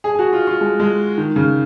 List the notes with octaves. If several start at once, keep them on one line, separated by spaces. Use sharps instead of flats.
G#4
G#4
F#4
F4
F4
G#3
G#3
D#3
C#3